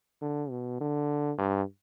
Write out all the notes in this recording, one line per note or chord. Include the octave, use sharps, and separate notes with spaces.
D3
B2
D3
G2